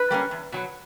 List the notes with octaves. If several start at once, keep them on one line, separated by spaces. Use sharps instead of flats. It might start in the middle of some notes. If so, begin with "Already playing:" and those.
Already playing: B4
G3 A#3 C#4
E2
B2 F#3